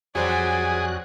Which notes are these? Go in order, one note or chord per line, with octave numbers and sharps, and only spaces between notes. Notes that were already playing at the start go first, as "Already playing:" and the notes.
F2 F#3 G3 F#4 G#4 C5 D5 F#6